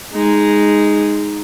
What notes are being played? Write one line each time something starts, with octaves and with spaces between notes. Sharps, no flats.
G#3 D#4